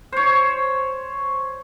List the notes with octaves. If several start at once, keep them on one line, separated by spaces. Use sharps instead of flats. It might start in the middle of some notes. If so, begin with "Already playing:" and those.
C5 C#5